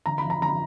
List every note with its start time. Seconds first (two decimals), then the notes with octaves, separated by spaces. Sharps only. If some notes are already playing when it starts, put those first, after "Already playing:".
0.06 D3 A#5
0.18 B5
0.24 F1
0.30 A#5
0.42 D3 A#5
0.48 B5